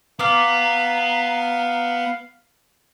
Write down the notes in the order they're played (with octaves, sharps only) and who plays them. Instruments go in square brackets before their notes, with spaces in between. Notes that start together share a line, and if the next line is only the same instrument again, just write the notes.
[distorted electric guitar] B3 [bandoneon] F5 [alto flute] A#5 [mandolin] D6 F6